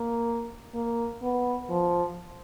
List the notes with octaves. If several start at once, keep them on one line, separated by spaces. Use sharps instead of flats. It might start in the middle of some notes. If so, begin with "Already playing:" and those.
Already playing: A#3
A#3
B3
F3